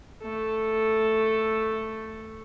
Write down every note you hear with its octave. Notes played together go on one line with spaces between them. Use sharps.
A3 A4